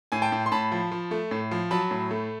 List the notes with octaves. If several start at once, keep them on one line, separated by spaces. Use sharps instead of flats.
A2 G#5
G5 A5
A2
C6
A2 A5 B5
F3
F3
A3
A2
F3
F#3 A5 B5
A2
A3